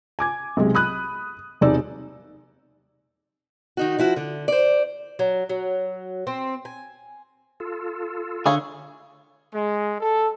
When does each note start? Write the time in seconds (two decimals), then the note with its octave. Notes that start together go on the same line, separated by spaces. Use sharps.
0.19 G#5 D6 G#6
0.57 B1 C3 G#3
0.75 B5 D#6 F#6
1.61 E1 C3 D#4 D5 E6
3.77 D#3 D#4 F#4
3.99 F3 E4 F#4
4.16 D3
4.48 C5 D5
5.19 F#3
5.49 F#3
6.27 C4
6.65 G#5
7.60 F4 A4
8.46 D3 G#4 C#5 F5
9.53 G#3
9.98 A4